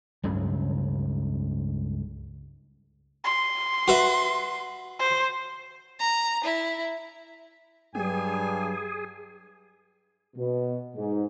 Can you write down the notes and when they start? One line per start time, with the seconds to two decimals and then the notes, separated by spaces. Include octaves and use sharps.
0.23 C#2 G2 C#3 F#3
3.24 C6
3.88 F#4 B4 E5
4.99 C5
5.99 A#5
6.44 E4
7.95 G2 F#3 G4 G#4 G#5
10.36 B2
10.95 G#2